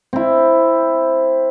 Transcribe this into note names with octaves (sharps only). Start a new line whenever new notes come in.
C4 E4